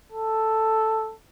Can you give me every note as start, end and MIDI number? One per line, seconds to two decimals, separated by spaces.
0.12 1.13 69